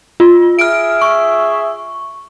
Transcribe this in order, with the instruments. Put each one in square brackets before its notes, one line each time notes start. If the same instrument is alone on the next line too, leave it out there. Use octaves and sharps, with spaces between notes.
[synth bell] F4
[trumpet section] G#4 E5 [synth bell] F6 D7
[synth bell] C#6